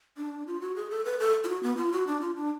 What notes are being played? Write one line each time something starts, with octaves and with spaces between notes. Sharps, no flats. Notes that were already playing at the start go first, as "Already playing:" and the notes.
D4
F4
F#4
G#4
A4
B4
A4
F4
F#4
B3
F4
F#4
D4
F4
D4